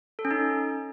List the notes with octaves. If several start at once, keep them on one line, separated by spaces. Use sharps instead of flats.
A4
C#4
D#4